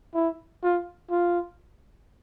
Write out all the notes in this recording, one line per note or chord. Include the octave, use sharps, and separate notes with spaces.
E4
F4
F4